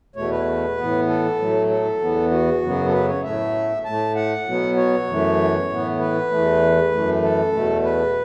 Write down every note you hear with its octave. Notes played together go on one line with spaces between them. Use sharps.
E2 B2 A3 C#5
B4
A2 E3 B3
A4
A2 F#3 A3
A4
E2 E3 B3
F#4
F#2 C#3 F#3 B3
A4
B4
C#5
A2 A3 E5
A2 A3 A5
F#5
B2 F#3 B3
C#5
F#2 E3 A3
A2 E3 B3
B4
E2 E3 A3
F#2 E3 A3
A4
E2 B2 A3
B4